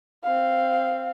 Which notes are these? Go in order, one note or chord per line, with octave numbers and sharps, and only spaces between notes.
C4 F5